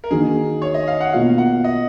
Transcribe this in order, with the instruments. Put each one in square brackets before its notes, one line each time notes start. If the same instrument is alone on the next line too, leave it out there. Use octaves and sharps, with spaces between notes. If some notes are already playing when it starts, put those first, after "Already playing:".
[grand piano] A#4
[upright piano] D#3 A#3 D#4 F#4 [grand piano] G#4
[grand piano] C#5
D#5
F5
F#5
[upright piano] B2 A#3 F4 [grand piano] F5
[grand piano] F#5
D#5